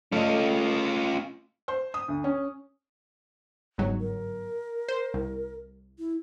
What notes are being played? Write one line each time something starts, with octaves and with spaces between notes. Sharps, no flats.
A3 C#4 F4 D#5
C5
D#6
D2
C#4
G1 G#2 F#3
A#4
C5
C2
E4